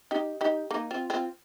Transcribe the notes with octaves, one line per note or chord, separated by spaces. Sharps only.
D#4 G4
D#4 G4
A#3 D#4
C4 F4
C4 F4